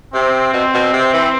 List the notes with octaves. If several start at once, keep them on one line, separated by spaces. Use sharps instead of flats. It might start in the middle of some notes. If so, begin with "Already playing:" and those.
C3 C4
B2
B2
C3
E3